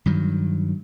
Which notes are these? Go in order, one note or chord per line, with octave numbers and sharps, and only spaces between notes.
G2 D#3 F#3